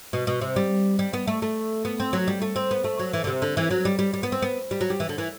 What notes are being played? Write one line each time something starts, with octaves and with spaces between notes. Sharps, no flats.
B2
B2
C3
G3
G3
B3
A3
A3
B3
C4
F#3
G3
A3
C4
B3
A3
F#3
E3
D3
C3
D3
E3
F#3
G3
G3
G3
B3
C4
B3
G3
F#3
G3
E3
D3
E3